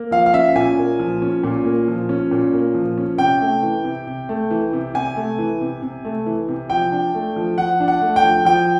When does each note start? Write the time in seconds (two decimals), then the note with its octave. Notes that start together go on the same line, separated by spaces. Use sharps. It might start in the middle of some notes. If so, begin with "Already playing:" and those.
Already playing: A#3
0.11 F3 F5
0.26 F5
0.33 C#4 E5
0.55 A#2 G#5
0.78 A#3
0.99 F3
1.22 C#4
1.44 A#2
1.65 A#3
1.88 F3
2.09 C#4
2.31 A#2
2.53 A#3
2.75 F3
2.98 C#4
3.18 C3 G5
3.41 A3
3.63 E3
3.84 C3
4.07 C3
4.29 A3
4.51 E3
4.73 C3
4.94 C3 G#5
5.16 A3
5.39 E3
5.61 C3
5.82 C3
6.05 A3
6.26 E3
6.49 C3
6.70 F3 G5
6.92 D4
7.15 A3
7.36 F3
7.58 F3 F#5
7.80 D4
7.88 F#5
8.02 A3
8.16 G5
8.23 F3
8.45 F3 G5